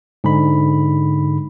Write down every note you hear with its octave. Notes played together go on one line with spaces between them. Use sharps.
G#2 D3 B5